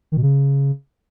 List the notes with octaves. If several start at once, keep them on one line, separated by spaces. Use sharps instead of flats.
D#3
B2
C#3